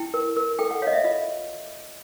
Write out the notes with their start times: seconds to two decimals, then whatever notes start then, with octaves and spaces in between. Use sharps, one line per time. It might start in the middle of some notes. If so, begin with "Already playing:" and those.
Already playing: E4 G5
0.14 A#4
0.37 A#4
0.59 A4 G5
0.70 F#5
0.82 C#5 D#5 F5
0.93 E5
1.04 F4 D#5